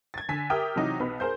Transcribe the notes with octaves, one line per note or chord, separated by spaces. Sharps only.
G#6 A6
D3 G#5 B6
G4 A#4 E5 G5 D#6 F6
C3 E3 F#3 D#4 F#4 G4
B1 B3 B5
G#4 A#4 C5 G6